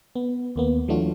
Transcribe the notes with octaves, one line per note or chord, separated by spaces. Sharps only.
B3
D#2 A#3 B3
E3 F#3 A3 D4 F4 F#4